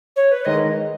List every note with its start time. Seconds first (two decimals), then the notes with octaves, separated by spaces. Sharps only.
0.16 C#5
0.31 B4
0.45 D#3 G#3 D#4 D#5